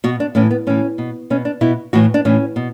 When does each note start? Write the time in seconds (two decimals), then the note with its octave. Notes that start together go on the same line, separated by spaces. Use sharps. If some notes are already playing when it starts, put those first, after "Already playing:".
0.04 B2 F#4
0.20 D4
0.35 A2 E3 C#4
0.51 B3
0.67 A2 E3 C#4
0.98 B2
1.30 B2 C#4
1.45 D4
1.61 B2 E4
1.93 A2 E3 F#4
2.14 D4
2.25 A2 E3 C#4
2.56 B2